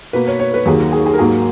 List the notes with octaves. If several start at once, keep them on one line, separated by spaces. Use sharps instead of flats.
B2 A#3 B4
C#5
C#5
B4
D#2 D#3 F#3 A#3 G#4
F#4
G#4
G#4
A#4
G#2 F#3 A#3 G#4